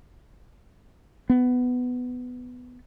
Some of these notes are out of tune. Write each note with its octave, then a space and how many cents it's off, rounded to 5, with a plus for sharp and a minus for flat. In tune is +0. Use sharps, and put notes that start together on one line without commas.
B3 +10